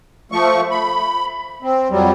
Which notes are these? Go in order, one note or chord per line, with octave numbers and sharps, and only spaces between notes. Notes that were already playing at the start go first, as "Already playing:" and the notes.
F3 A3 C#6
B5
C4
F2 F#3 G3